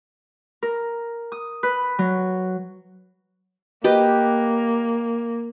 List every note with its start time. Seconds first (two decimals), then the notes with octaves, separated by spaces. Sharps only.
0.63 A#4
1.32 D#6
1.63 B4
1.99 F#3
3.84 A#3 G4 B4 D#5